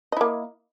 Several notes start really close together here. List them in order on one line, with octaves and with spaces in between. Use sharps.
D#5 E4 A#3